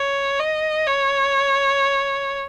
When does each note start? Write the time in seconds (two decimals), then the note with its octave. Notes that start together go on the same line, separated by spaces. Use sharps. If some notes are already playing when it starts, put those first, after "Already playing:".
Already playing: C#5
0.40 D#5
0.88 C#5